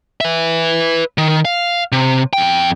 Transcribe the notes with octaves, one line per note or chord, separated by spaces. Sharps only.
B4 E5
D#3
F5
C3
F2 G5